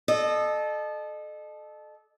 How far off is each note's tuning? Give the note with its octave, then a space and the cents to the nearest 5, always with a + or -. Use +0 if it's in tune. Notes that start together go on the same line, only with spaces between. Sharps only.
A4 -25 D#5 -35